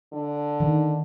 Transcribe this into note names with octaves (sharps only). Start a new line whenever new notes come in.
D3
D#3